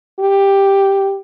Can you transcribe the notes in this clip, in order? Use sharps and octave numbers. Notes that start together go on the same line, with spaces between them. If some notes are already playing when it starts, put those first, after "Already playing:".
G4